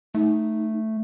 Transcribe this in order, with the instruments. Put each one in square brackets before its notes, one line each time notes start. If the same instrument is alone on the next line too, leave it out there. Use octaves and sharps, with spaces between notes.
[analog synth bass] A3 [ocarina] D#4